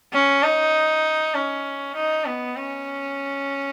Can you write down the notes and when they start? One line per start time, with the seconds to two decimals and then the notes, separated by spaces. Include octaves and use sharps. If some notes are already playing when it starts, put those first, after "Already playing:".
0.13 C#4
0.43 D#4
1.34 C#4
1.96 D#4
2.25 B3
2.56 C#4